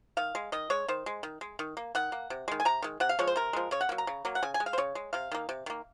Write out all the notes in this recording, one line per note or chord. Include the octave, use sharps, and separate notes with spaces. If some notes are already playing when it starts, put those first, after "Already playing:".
D#3 F5
G#3
D#3 D#5
G#3 C#5
D#3 C5
G#3
D#3
G#3
D#3
A#3
D#3 F#5
A#3
C3
D#3 G#3
G#5
C3 A#5
D#3 G#3
C3 F#5
F5
F3 G#3 C#5
C5
C3 A#4
F3 G#3
C#3 C#5
F#5
F#3 A#3
A#5
C#3
F#3 A#3
F#5
C#3 G#5
G#5
G#3
F5
C5
C#3 C#5
G#3
C3 F5
D#3 A#3
C3
D#3 A#3